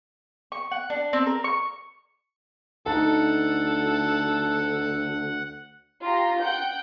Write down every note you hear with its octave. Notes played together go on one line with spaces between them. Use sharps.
C#6
F#5
D4
C4
A#4
C#6
D2 D#4 A4 F#5 A5
F4 G4 A#5
F#5 G5 G6